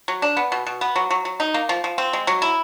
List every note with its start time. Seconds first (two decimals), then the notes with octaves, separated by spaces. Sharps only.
0.08 F#3
0.22 D4
0.37 B3
0.52 B2
0.67 B2
0.81 B3
0.96 F#3
1.10 F#3
1.25 F#3
1.40 D#4
1.54 A#3
1.69 F3
1.84 F3
1.98 C4
2.13 G#3
2.27 F#3
2.42 E4